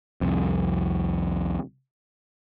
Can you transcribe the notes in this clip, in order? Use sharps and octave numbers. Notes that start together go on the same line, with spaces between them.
C2 F2